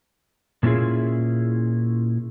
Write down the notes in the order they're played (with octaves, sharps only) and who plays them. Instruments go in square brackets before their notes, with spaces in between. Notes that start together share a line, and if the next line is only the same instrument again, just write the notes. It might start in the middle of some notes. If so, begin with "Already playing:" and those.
[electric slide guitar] A#2 A3 C#4 E4 F4 G#4